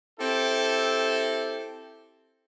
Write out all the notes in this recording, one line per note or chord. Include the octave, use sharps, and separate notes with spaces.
C4 E4 G4 A4